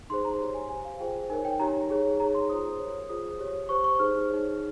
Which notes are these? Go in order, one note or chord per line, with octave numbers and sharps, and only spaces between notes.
D#4 G#4 C5 C6
A#5
G4 C#5
G#5
G4 C5 G#5
F5
F4 G#4 C5 G5
D#4 A#4 C#5 G#5
G5
D#4 G4 C#5 A#5
D#4 G#4 C#5
D#4 G#4 C#5 A#5
C6
F4 G#4 C5 D#6
G4 A#4 C#5
F4 G#4 C5 D#6
G4 C#5
G4 C5 C#6
C#6
D#4 G#4 C5 F6
D#4 G#4 C#5